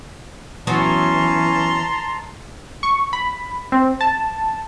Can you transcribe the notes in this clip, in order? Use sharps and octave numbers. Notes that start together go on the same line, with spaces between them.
E3 F#3 B3 C#4 A5 A#5 C6
C#6
B5
C4
A5